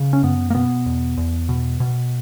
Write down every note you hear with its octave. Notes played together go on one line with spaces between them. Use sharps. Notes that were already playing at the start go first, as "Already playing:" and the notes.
Already playing: C#3
C#4
F#2 B3
A#3
B2 B3
E2
E2
B2
B2